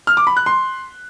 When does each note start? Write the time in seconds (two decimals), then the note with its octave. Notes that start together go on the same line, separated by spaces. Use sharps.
0.07 F6
0.17 D6
0.27 B5
0.37 F#6
0.46 C6